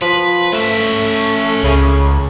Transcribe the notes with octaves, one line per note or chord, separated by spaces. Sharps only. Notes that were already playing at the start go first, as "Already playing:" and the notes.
F3 B4
A3 C#4 E5
C#2 C#3